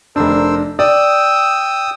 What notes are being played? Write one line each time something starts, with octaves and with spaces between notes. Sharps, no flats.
F1 D4 A#4 C5 E6
D5 G5 D#6 E6